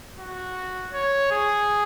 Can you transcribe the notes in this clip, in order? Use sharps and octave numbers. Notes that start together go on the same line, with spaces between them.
F#4
C#5
G#4